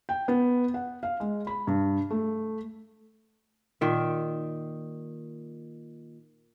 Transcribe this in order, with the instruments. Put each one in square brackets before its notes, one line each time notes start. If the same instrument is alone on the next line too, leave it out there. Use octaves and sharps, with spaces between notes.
[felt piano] G5
B3
F#5
F5
G#3
B5
G2
A3
[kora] A#2 D#3 E5